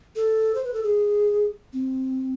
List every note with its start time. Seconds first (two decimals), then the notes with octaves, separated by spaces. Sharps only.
0.16 A4
0.55 C5
0.65 B4
0.74 A4
0.83 G#4
1.73 C4